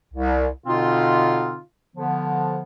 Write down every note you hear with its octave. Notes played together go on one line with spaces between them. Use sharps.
C2
B2 D3 C4 D#4 F4
D3 F3 B3